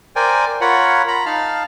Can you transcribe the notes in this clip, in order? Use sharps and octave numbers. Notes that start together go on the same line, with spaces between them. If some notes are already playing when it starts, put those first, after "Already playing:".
A#4 C5 D5 G5 G#5
F4 A#4 C#5 F#5 B5
A#5 B5
D#4 F5 A5 F6